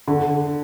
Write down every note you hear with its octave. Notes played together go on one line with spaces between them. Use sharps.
D3